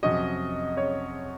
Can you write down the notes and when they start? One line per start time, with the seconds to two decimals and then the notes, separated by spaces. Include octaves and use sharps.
0.03 F2 C3 F#3 C#4 F#4 D#5
0.77 C#5